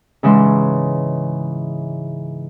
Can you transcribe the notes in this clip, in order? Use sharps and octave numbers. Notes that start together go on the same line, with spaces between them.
G#2 C#3 E3 G#3 C6